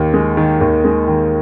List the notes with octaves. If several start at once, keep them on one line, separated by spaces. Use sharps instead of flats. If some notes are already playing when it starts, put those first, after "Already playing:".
Already playing: D#2 D#3
G#3
D#3
D#2
G#3
D#3